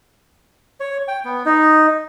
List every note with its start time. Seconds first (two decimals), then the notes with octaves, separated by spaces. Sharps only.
0.80 C#5
1.08 G5
1.25 B3
1.45 D#4